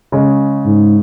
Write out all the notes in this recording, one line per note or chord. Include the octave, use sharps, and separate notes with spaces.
C#3 G#3
G#2